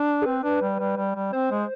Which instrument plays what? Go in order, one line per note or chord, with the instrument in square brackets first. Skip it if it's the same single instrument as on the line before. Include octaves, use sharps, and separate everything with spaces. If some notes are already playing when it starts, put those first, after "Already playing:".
Already playing: [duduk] D4
[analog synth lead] G#4
[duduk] C4 [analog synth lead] B4
[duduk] D4
G3
G3
G3
G3
[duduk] C4 [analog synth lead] C5
[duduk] G#3